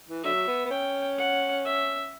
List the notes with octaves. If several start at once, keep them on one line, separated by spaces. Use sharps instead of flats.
E3
D3 F#3 E5
B3
B3
C#4 G5
F#5
E5